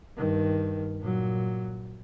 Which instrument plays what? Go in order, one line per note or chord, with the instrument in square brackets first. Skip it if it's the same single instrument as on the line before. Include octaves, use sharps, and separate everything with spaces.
[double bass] G2 D#3
A#2 F#3